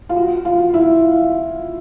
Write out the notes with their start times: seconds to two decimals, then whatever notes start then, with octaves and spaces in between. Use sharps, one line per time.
0.09 F4
0.16 F#4
0.45 F4
0.74 E4